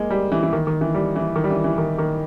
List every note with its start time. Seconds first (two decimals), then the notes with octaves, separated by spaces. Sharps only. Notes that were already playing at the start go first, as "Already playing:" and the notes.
Already playing: G#3 A#3
0.10 G3
0.32 E3
0.43 E3
0.53 D#3
0.67 D#3
0.81 E3
0.94 G3
1.16 E3
1.36 D#3
1.44 G3
1.50 E3
1.64 E3
1.78 D#3
1.99 D#3